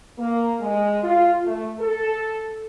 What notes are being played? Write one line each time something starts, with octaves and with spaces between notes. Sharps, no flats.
A#3
G#3
F4
A3
A4